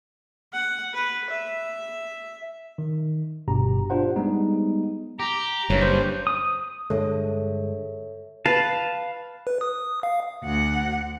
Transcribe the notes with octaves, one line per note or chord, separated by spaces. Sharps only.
F#5
B4
E5
D#3
G1 G2 B2 G4 A#5
D4 F4 G4 C5 F#5
G3 G#3 B3 D#4
G4 A#5
F#1 G2 C#4 G4 B4
C5 C#6
D#6
G2 D3 G#3 A4 C#5 E5
B4 F5 A5
B4
D#6
F5
D2 F#5